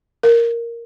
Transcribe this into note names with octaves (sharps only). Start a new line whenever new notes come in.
A#4